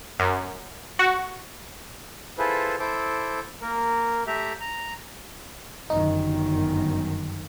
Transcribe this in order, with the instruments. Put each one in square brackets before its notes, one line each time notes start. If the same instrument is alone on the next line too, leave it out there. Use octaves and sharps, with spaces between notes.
[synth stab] F#2
F#4
[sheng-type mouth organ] E4 F4 G#4 A4 B4 C5
E4 A4 C5 D6
A#3 A#4
A3 G4 E5 A#5
A#5
[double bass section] G1 F#2 D#3 [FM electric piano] D#4